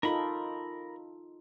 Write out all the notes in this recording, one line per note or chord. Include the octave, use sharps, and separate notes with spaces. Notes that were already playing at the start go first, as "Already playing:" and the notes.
D#4 F4 A4 A#4 B5